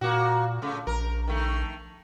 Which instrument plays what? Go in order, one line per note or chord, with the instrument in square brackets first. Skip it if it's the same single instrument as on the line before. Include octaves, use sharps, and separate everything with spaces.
[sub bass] A#2 [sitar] A#3 F#4
[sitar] C#3 A3
[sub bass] A#1 [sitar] A#4
[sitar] D#3 A3